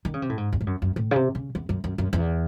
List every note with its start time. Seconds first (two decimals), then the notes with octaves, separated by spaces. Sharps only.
0.05 D#3
0.14 C#3
0.22 C3
0.29 A2
0.37 G#2
0.53 E2
0.61 G#2
0.67 F#2
0.82 F#2
0.96 A2
1.11 C#3
1.16 C3
1.35 C#3
1.55 E2
1.69 F#2
1.84 F#2
1.98 F#2
2.13 E2